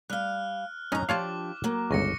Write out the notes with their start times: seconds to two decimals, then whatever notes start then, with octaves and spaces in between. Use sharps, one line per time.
0.10 G3 F5 F6 F#6
0.92 F#2 C#4 D#4 A#5
1.09 F3 D4 F4 G4 C#5 F5 D6
1.64 F#3 A#3
1.91 G1 C#2 C#6 A#6 C#7